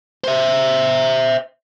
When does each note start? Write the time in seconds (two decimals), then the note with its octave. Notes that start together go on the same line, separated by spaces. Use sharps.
0.24 C5 E5